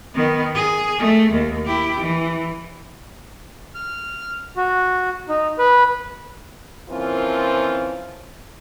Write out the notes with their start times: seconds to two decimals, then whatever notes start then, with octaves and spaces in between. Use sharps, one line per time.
0.15 D#3 B3
0.55 G#4
0.98 A3
1.32 D#2
1.66 E4 G4
2.00 E3
3.75 F6
4.57 F#4
5.29 D#4
5.59 B4
6.90 E3 F3 A#3 C4 C#4 F4